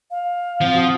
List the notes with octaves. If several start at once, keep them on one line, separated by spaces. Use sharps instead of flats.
F5
F3 C4 F#5
F#4 D#6